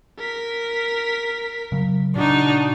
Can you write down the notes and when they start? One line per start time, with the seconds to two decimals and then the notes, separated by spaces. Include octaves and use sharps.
0.18 A#4 B6
1.72 C#3 F#3
2.16 A#2 C#3 D4 D#4 F#4